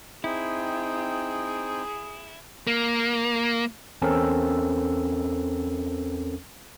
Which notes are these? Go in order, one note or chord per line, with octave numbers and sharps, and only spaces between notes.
C4 D#4 E4 G#4 G5
A#3
E2 C4 C#4 A4 A#4 E6